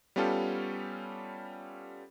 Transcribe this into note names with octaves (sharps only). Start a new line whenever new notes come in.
G3 B3 C#4 F4 G4 A4